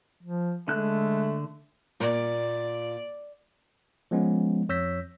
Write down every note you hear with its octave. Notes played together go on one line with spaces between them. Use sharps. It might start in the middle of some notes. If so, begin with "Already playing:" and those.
F3
D3 G#3 A3 F#6
A#2 D5
F3 G#3 B3 C#4
F2 C#5 E6 G6 A#6 B6